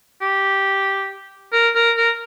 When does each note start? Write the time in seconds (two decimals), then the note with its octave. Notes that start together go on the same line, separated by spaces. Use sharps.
0.21 G4
1.53 A#4
1.75 A#4
1.97 A#4